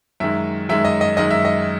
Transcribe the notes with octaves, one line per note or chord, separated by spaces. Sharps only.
F#2 D#3 G#3 E5
F#2 D#3 G#3 E5
D#5
D#5
F#2 D#3 G#3 D#5
E5
D#5